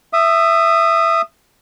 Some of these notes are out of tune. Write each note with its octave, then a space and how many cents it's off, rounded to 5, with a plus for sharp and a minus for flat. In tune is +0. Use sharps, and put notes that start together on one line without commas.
E5 +10 D#6 -15